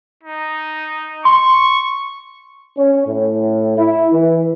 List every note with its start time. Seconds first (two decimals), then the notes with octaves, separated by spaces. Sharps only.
0.24 D#4
1.25 C6 C#6
2.77 C#4
3.07 A2
3.77 E4
4.12 E3